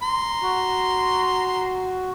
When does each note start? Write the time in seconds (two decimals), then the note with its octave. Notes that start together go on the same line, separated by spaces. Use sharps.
0.03 A#5 C6
0.43 F#4